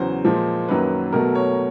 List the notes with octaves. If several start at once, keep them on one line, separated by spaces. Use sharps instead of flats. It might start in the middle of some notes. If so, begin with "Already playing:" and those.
Already playing: E2 C#3 F#3 C5
A#2 F3 G#3
F#2 D#3 F#3 A#3 B4
B2 F#3 A3 A#4
C#5